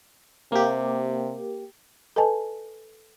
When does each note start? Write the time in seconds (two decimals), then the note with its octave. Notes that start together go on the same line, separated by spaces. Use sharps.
0.52 C3 A#3 G4
2.16 A4 B4 D#5 G#5 A5